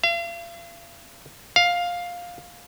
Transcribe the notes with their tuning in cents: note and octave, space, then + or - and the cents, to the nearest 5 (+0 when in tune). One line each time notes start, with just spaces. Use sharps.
F5 -40
F5 +10